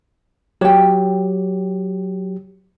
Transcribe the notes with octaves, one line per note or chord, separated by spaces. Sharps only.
F#3 G4 C#5 G5